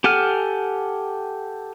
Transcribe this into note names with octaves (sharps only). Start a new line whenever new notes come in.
G4 A4 F#5 G#5 F6